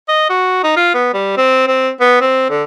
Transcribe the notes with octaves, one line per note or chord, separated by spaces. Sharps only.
D#5
F#4
D#4
F4
B3
G3
C4
C4
B3
C4
D3